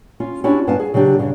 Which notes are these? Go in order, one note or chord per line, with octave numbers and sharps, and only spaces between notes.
C#4 F4
C#4 D4 E4 F#4 G4
G2 B3 F5 G#5 A5
G#4
C#3 F#3 D4 G4
G2 C#3 D4